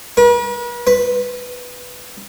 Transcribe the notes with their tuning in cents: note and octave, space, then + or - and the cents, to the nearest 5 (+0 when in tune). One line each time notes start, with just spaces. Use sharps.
B4 -45
B4 +0